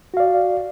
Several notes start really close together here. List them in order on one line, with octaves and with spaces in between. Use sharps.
F#4 F5 D5